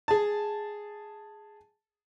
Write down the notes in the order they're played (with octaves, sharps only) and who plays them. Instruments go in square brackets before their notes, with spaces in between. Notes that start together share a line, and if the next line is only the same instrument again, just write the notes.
[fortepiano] G#4 A5